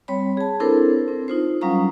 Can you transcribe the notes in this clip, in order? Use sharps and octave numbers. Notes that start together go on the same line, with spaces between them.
G3 C4 C#5 B5
G#4 A5
C4 D4 E4 A4 A#4 C5
C4
D#4 F4 C5
F#3 G3 C#4 F5 A#5 D#6